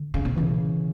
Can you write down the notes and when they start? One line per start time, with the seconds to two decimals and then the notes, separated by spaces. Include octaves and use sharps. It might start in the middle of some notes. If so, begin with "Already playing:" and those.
Already playing: D3
0.14 C#3
0.25 B2
0.36 C#3 E3